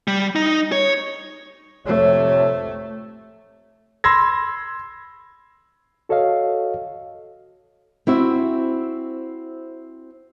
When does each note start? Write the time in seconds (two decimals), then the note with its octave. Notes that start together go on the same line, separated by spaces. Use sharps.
0.08 G3
0.36 D#4
0.72 C#5
1.87 F2 C3 A3 C#5
4.04 B5 C6 E6 G#6 A#6
6.09 F#4 A4 C#5 D#5 F5
8.07 C4 E4 F#4 E5